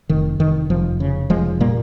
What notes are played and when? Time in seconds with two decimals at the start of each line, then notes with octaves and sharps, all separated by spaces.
0.09 F1 D#3
0.39 F1 D#3
0.70 F1 F3
1.00 C#3
1.30 F1 F3 G#3
1.60 A#2 G3 A#3